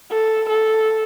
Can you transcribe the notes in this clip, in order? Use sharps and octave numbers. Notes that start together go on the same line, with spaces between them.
A4
A4